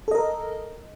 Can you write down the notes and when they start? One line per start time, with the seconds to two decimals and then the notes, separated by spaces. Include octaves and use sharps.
0.08 A4
0.11 D#5
0.15 A#4